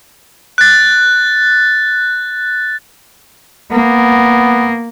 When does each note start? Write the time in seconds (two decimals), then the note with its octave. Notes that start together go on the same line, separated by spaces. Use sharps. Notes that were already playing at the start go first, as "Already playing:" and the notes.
0.58 F#6 A6
3.72 A#3 B3